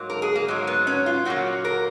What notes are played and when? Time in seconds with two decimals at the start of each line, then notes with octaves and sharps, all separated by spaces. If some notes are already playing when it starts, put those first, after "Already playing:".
Already playing: G#2 F#3 A#3
0.10 A#4
0.22 G#4
0.35 A#3
0.48 G#2 F#3 A#3
0.67 B3
0.87 C#4
1.06 F4
1.25 A#2 F#3 A#3 F#4
1.65 A#4